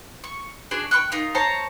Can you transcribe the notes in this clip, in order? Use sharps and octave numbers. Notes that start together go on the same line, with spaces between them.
C#6
D4 F#4 G#4 D5
G5 B5 C#6 F#6
D#4 F4 A#4
C5 C#5 A5 A#5